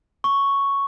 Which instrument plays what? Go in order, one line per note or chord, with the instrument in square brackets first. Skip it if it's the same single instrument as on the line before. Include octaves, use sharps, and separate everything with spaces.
[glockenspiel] C#6